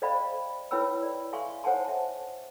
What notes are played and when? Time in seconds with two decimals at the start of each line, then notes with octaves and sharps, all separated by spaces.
0.02 C5 D5 D#5 F5 G5 B5
0.71 E4 B4 C#5 G5 B5 E6
1.03 D5
1.32 E5 F5 G#5 C6 C#6
1.64 C5 C#5 F#5 G#5 A5 C6
1.85 E5 A5